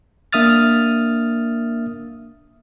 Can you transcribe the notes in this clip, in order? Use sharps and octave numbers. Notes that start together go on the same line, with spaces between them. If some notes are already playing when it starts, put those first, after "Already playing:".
A#3 D4 E5 D#6 F6 A6